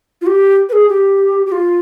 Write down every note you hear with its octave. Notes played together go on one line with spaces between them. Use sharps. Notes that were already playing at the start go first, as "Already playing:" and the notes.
F4
G4
B4
G#4
G4
G4
F4